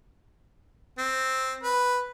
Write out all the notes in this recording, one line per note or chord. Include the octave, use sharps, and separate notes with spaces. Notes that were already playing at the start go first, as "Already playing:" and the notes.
C4
B4